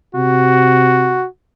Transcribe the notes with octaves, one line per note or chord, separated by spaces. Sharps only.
C3 F#4